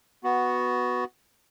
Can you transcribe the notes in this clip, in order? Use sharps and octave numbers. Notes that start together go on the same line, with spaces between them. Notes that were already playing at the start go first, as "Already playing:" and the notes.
B3 F#4